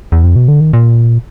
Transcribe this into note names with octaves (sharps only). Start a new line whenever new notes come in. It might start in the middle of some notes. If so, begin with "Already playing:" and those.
E2
F2
B2
D3
D#3
A#2